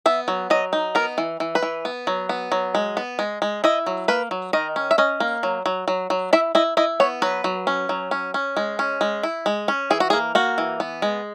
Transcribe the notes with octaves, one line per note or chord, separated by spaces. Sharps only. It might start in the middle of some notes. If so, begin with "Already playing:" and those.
B3 E5
F#3
F#3 D#5
D#4
B3 A#4
E3
E3
B4
E3
B3
F#3
B3
F#3
G#3
B3
G#3
G#3
E4 D#5
F#3
A#3 B4
F#3
D#3 D#5
C#4
E5
C#4 D#5
A#3
F#3
F#3
F#3
F#3
E4 E5
E4 D#5
E4 D#5
B3 C#5
F#3 B4
F#3
C#4
F#3
C#4
C#4
G#3
C#4
G#3
E4
G#3
C#4
E3 G#4
F#4
G#4
A#3
A#3 F#4
E3
B3
G#3